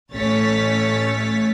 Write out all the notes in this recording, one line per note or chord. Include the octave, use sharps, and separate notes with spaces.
A1 A3 C#4 C#5 A6 B6